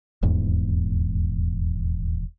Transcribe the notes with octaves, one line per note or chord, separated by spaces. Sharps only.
D#1 E2 G#2